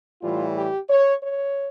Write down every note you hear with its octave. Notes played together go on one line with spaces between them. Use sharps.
A2 E3 G3 F4
G4
C#5
C#5